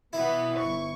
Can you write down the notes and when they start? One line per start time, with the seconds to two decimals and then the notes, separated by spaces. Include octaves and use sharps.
0.13 B2 E3 B3 E4
0.57 G1 C#6